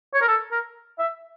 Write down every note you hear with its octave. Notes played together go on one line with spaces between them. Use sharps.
C#5
A#4
A4
A#4
E5